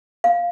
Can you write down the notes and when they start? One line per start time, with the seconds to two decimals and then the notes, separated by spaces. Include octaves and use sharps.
0.24 F5